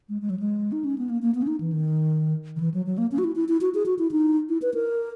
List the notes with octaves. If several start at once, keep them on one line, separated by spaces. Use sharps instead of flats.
G#3
G#3
F#3
G#3
D#4
C#4
B3
A#3
A#3
B3
C#4
D#4
E3
D#3
D#3
E3
F#3
F#3
A#3
C#4
F#4
E4
E4
E4
F#4
G#4
F#4
E4
D#4
E4
B4
A#4